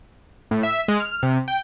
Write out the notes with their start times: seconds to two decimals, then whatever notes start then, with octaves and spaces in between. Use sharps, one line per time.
0.51 A2
0.63 E5
0.88 G#3
1.00 F6
1.23 C3
1.48 G5